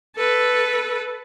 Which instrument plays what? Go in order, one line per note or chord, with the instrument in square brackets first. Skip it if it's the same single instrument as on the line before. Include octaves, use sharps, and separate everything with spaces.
[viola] A4 B4